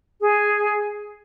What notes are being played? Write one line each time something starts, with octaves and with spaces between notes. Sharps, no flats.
G#4